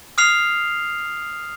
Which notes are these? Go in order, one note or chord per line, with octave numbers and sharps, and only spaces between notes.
D#6 F6 C7 F7